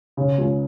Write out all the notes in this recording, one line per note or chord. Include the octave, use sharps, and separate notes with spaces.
C#3
C#2